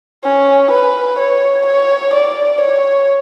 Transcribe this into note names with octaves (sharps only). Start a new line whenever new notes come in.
C#4
B4
C#5
C#5
D5
C#5